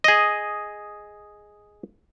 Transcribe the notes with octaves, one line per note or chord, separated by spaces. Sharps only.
G#4 D#5